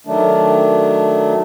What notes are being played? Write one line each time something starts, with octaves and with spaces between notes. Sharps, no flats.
D#3 F#3 A3 D4